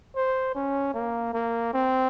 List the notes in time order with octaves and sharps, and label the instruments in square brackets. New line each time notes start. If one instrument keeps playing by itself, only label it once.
[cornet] C5
C#4
A#3
A#3
C4